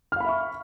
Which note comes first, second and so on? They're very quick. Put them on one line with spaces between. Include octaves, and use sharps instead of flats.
F6 F5 B5 E5 C#6